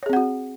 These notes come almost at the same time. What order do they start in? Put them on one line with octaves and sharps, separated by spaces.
C#5 G#4 C4 F#5 F#4